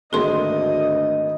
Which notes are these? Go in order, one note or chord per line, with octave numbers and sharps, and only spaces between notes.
G#1 D2 A3 A#3 G#4 D#5 C6